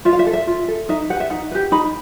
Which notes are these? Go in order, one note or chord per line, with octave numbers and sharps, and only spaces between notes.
F4 E5
F5
E5
A4
E5
F4
A4
D#4 E5
G4 B4 F#5
E5
D#4 F#5
G4 B4
D#4 B5